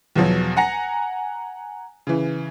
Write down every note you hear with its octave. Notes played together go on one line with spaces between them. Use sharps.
E2 B2 F3 F#3
F#5 G#5 A#5 A#6 C#7
C#3 E3